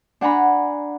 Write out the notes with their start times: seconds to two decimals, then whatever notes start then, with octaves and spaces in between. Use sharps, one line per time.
0.21 D4 F#5 G#5 A#5 B5